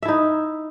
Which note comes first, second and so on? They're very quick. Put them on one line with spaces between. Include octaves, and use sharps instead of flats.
E5 E4 D#4